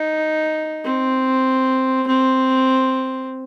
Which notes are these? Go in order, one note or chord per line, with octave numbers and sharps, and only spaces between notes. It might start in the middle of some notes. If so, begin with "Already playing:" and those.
Already playing: D#4
C4
C4